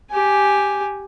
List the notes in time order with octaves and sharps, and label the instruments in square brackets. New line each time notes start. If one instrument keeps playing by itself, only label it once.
[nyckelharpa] G4 G#5